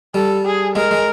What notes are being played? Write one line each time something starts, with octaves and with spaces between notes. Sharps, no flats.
G3 A4
G#4
G#3 A#4
G#3